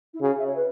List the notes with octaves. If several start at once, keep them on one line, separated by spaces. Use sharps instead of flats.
E4
C#3 F#4
E5
C#5
B4